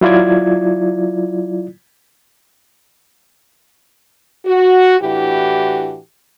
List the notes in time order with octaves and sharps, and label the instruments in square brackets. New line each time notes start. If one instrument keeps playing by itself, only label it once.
[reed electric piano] F#3 E4 F4 D5 G#6
[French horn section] F#4
A2 E3 D4 E4 F#4 G4